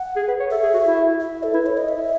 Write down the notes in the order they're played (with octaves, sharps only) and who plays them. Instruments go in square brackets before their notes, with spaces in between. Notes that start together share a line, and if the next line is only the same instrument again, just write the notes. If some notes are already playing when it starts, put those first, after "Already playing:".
Already playing: [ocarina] F#5
[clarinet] G#4
B4
C#5
[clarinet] A4 [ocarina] E5
[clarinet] G#4
F#4
E4
[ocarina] E5
A4
[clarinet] E4 [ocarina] B4
[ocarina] C#5
D#5
E5